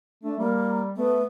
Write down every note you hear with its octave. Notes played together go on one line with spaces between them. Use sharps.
A3 D4
G3 A#3
A3 B3